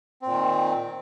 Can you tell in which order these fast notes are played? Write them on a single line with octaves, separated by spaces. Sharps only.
C4 A#2 D#3